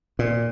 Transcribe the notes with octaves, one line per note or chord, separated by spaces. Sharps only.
A#2